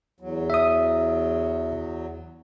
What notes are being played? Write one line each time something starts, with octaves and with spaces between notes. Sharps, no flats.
E2 F#3
E5 D#6